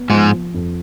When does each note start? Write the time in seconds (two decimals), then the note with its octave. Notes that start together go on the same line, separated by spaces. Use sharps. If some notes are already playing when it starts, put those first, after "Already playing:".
Already playing: B3
0.10 G#2 F3 G#3
0.32 F3
0.54 F2